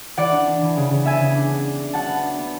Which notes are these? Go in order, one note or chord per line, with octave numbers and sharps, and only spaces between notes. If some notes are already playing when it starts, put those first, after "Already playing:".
E3 D5 F#5
D4
D4
E3
C#3
C#3
B3 E5 G#5
C#3
D4
D4
D4
D4
F#3 F#5 A5
B3
D4
B3